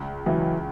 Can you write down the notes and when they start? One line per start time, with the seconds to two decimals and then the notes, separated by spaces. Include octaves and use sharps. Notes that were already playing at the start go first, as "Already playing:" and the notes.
Already playing: C#2
0.26 C#2 E3 F#3